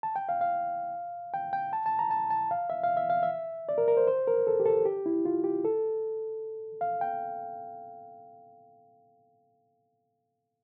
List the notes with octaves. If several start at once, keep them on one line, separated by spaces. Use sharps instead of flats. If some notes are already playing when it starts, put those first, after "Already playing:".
A5
G5
F5
F5
G5
G5
A5
A5
A#5
A5
A5
F5
E5
F5
E5
F5
E5
D5
A#4
A#4
C5
C5
A#4
A4
G4
A4
G4
E4
F4
G4
A4
F5
G5